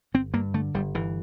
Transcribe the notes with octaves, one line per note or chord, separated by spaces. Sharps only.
G1 C4
G2 A#3
D3 A3
G1 G3
G1 E3